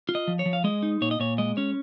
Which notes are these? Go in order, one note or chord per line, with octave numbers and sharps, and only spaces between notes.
F4
D#5
F3
C#5
F3
F5
G#3 D#5
D#4
A#2 C#5
D#5
A#2 C#5
G#3 D#5
C#4 C#5